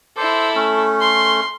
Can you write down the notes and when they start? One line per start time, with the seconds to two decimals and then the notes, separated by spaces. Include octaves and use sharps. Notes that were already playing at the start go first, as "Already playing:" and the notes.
0.17 E4 A4 C5 D6
0.55 A3 C#4
1.01 C6